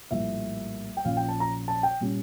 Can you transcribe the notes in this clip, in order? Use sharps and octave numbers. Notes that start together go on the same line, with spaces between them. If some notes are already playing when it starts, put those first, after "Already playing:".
A#1 A2 G3 A#3 E5
G5
A#1 A#2 F3 C#4 F5
G5
A5
A#5
A5
G5
A#2 G3 C#4